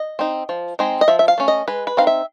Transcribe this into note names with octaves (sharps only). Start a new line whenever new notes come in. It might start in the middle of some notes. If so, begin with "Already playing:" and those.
Already playing: D#5
C4 D#4
F3
G#3 C4 D#4
D#5
F3 E5
E5
F5
A3 C#4
D#5
G#3 B4
B4
C4 D#4 F5
E5